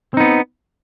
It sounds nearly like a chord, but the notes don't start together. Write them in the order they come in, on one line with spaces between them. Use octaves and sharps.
C4 D#4 B3